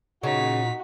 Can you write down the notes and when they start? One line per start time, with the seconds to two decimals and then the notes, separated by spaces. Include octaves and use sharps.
0.23 A#2 C#3 D#4 F#4 B6